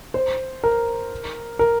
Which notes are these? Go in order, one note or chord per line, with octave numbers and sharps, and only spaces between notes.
C5
A#4
A#4